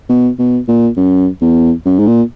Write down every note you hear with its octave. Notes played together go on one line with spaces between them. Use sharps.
B2
B2
A#2
F#2
E2
F#2
G#2
A#2